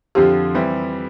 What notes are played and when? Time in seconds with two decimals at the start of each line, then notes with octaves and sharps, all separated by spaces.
0.15 F2 D3 F3 C4 F4 G4
0.54 E3 G3 C4 E4